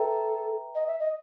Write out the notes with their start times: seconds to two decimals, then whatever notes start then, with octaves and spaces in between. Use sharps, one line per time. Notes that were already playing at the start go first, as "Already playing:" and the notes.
Already playing: A4 B4 E5 G5 A#5
0.75 D#5
0.87 E5
1.00 D#5